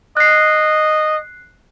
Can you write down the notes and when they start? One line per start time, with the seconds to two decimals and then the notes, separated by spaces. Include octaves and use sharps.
0.17 D#5 F#6 C7